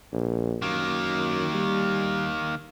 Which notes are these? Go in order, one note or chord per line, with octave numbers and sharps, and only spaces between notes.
A#1
F#2 D#3 A#3
G3